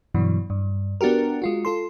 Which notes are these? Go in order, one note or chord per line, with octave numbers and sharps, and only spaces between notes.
G2 B2 E3 F#3
G2
B3 D4 F#4 G4 A#4
G#3 F4 F#4
F4 A4 C6